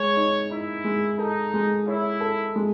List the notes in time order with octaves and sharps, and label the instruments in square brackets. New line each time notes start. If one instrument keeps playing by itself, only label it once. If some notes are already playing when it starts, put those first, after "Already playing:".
Already playing: [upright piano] G#3 [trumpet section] C#5
[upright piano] D#4
[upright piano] D#4 [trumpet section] E4
[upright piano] G#3
[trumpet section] D#4 [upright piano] A4
[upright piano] G#3
[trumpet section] E4 [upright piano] C#5
[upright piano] A4
G#3